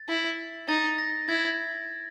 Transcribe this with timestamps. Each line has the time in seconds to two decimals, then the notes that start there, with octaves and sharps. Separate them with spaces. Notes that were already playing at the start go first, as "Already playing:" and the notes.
Already playing: A6
0.09 E4
0.68 D#4 A6
0.98 A#6
1.28 E4 G#6